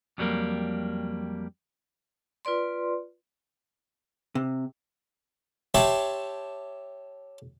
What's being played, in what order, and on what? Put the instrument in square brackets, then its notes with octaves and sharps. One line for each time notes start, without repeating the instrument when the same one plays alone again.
[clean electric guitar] F2 F#3 G3 A3 A#3
[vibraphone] F4 B4 D5 C6
[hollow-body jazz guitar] C3
[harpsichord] G4 C#5 E5 A5 B5 C6